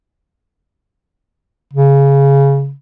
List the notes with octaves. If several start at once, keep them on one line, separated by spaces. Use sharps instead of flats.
C#3